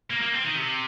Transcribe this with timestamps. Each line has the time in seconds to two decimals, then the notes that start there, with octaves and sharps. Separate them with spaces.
0.10 A#3
0.21 A#3
0.32 C4
0.44 D#3
0.55 C3